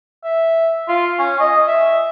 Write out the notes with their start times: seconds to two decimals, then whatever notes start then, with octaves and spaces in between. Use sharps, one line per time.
0.24 E5
0.88 F4
1.19 C#4
1.40 D#5
1.67 E5